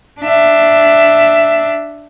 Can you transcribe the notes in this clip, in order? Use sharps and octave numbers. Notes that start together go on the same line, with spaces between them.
D4 E5